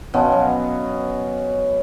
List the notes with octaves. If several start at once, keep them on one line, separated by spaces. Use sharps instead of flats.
B2 F3 B3 C#4
F#3